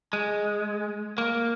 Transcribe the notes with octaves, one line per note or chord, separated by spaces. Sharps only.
G#3
A#3